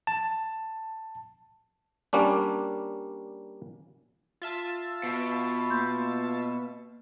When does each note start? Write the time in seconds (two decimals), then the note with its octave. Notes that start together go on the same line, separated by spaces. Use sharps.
0.07 A5
2.13 G3 A#3 C#4 D4
4.42 F4 E5 A5
5.03 B2
5.70 A#3 C6 G6